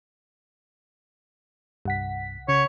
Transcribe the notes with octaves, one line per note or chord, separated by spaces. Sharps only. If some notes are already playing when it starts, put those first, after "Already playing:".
C2 G2 F#5 B6
C#3 C#5